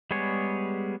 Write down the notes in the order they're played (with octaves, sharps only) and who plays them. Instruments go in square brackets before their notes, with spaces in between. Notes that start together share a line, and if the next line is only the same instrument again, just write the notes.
[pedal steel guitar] G3 G#3 B3 G#4 C#5